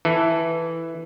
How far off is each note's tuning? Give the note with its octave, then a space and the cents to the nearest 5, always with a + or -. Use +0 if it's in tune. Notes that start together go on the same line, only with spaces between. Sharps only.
E3 +0 A4 +0